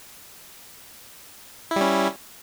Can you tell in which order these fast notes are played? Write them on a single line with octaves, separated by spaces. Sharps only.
E4 G3 C#4